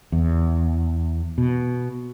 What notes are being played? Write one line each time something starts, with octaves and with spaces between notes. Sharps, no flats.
E2
B2